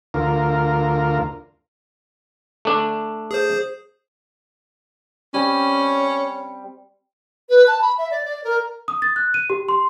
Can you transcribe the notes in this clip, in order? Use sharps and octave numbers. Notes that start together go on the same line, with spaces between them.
D2 F4 A#4
A3 D4
G#4 C5
G3 C4 C#4
B4
A5
B5
E5
D5
D5
A#4
D#6
A6
F#6
D#7
G4
C6